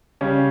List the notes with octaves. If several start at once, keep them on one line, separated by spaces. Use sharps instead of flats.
C#3 G3 C#4